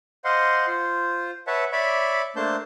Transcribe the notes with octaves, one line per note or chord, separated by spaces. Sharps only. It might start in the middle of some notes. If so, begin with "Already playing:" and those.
C5 D#5 F5 F#5 C6
F4 C5
B4 C#5 E5 F#5 A5
C#5 D5 E5 B5 D6
A3 A#3 D4 C5 A5 G6